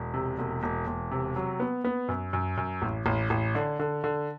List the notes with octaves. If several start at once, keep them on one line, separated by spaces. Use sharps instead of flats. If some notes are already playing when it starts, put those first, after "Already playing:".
Already playing: E1
C3
E1
E1
E1
C3
F#3
B3
B3
F#2
F#2
F#2
A1
A1
A1
D3
D3
D3